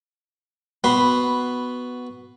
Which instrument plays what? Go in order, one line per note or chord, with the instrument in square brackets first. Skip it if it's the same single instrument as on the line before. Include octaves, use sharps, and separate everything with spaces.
[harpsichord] B3 F#4 C6 [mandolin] B5